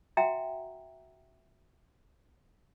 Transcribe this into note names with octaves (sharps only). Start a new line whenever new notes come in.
F#4 E5 F#5 G5 A#5